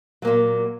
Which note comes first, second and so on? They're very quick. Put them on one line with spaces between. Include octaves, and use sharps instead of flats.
F#3 A#3 A#2